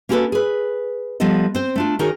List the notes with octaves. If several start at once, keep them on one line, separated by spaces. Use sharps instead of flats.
A#3 C#4 F#4 G4 A4 B4
G#4 B4
F3 G3 B3 A4 D#5
C4 C5
A3 D4 F4
D#3 D#4 F#4 G#4 A#4 C#5